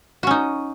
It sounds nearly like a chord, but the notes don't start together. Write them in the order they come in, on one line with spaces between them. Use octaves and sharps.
F#4 C#4 D#4